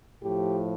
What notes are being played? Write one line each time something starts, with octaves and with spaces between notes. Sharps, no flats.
A2 F3 G4